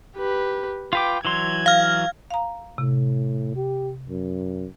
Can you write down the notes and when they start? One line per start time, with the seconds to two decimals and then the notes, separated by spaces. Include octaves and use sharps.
0.17 G4 B4
0.93 F4 B4 G5 D6
1.25 E3 F#3 C6 G#6
1.66 F5 F6
2.31 F5 A#5
2.78 A2 C3
3.56 G4
4.09 F#2